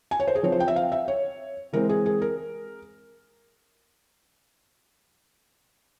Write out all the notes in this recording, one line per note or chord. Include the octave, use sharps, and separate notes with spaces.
G#5
C#5
C5
G#4
F3 C4 C#5
C5
G5
E5
F5
E5
C#5
E3 G#3 C4 A#4
G#4
G#4
A#4